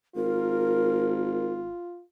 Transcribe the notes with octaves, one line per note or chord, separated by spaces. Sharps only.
G#1 F4 A#4